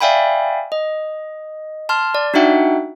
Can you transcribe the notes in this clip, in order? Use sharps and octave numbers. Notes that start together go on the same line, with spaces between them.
D5 E5 F5 G5 G#5 B5
D#5
A5 C6 F6
D5
D4 D#4 F#4 E5 F#5 G5